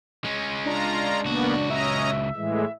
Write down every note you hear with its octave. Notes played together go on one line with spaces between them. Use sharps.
G#3 C#4
D4 F4 A#5
C#2 A#3 B3 F#4
C#4 D#5 E5 A#5
A2 E3 G#3